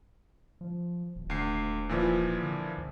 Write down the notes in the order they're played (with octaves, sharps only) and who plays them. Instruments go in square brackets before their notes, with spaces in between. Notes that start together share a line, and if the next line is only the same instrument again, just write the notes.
[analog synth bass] F3
D#1
[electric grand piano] D2 C7
A#2 E3 F3
[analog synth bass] D3
C#2